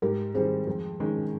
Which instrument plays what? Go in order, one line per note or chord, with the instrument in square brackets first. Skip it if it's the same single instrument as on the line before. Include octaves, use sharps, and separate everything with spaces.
[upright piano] G#2 [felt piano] G4 A#4
[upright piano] D#3 G3 C4 [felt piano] G#4 C5
[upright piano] F2
D#3 G#3 C#4